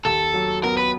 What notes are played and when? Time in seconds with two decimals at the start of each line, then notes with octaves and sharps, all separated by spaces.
0.05 D#2 A4
0.34 F#3
0.64 B3 A#4
0.77 B4